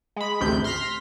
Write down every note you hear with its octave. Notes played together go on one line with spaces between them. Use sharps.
G#3 B5
A1 D2 C3 G6
C6 F6 A#6 B6